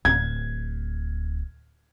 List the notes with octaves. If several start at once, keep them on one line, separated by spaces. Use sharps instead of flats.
D1 G#6